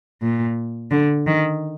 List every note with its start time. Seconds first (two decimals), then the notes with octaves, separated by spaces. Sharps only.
0.22 A#2
0.91 D3
1.27 D#3